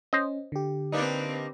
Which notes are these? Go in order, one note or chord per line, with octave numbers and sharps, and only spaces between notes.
C#4 C5 D#5
D3 G4
A#3 C4 D4 D#4 B4